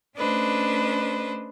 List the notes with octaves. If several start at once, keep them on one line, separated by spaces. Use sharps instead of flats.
A3 C#4 D4 B4 C5 D#5